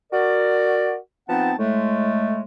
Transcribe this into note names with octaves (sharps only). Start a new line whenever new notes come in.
F#4 A#4 D5
F3 B3 C4 D#4 F#5 A5
A2 G#3 A3